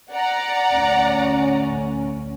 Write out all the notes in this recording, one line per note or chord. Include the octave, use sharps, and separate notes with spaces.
D5 F#5 A#5
D2 C#4